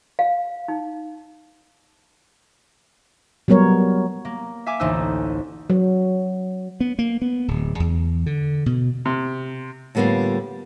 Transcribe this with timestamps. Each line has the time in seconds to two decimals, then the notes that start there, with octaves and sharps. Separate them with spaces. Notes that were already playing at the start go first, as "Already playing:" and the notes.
0.19 F5
0.68 D#4
3.48 F#3 G3 B3 A#4 C#5
4.25 A#3
4.66 E5 F5 G#5 D6
4.80 A1 D2 D4 D#4 C5 E6
5.70 F#3
6.80 B3
6.99 A#3
7.22 B3
7.48 D1
7.80 E2
8.26 D3
8.66 B2
9.05 C3
9.95 A2 D3 G3 A#3 B3 F4